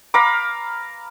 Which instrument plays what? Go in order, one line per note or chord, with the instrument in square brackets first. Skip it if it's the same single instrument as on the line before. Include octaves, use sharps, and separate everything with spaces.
[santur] F5 A#5 B5 D6